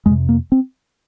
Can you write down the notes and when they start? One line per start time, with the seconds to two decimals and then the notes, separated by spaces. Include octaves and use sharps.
0.06 F2 C3 G#3
0.29 A#3
0.52 C4